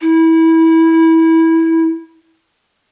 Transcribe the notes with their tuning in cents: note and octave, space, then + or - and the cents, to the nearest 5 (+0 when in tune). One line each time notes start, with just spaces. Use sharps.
E4 -20